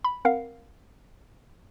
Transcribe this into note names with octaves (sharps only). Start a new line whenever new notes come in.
B5
C4 A#4 F5 F#5